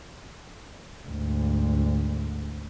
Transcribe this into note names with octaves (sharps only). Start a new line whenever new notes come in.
D2 G#2